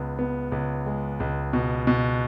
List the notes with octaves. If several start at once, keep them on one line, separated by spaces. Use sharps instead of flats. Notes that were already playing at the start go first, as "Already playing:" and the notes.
Already playing: C#2 B3
B3
C#2
G#3
C#2
B2
B2